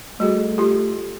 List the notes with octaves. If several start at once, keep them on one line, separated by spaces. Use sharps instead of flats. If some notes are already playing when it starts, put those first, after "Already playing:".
G3 A3 F#4 G#4
F4 G4